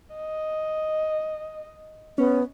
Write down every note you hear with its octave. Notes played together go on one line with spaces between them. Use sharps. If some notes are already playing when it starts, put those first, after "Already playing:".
D#5
B3 C#4